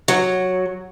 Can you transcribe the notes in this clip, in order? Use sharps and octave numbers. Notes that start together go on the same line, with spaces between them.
F#3